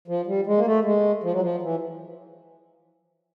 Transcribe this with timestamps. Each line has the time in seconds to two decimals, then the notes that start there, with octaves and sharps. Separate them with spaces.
0.08 F3
0.27 G3
0.46 G#3
0.57 A#3
0.66 A3
0.85 G#3
1.24 F3
1.32 F#3
1.41 F3
1.62 E3